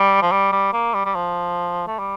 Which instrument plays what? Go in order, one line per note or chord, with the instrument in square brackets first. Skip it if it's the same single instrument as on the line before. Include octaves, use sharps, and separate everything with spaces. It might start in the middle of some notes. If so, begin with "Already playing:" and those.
Already playing: [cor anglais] G3
F3
G3
G3
A#3
G3
G3
F3
A3
G3